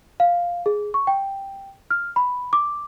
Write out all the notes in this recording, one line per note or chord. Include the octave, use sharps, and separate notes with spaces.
F5
G#4
C#6
G5
F6
B5
D6